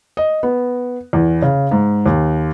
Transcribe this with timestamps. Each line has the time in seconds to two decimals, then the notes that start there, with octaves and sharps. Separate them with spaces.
0.17 D#5
0.43 B3
1.13 E2
1.42 C#3
1.71 G#2
2.06 D#2